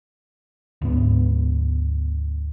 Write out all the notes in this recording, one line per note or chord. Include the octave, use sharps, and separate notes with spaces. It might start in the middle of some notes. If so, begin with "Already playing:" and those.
D2 G#2 B3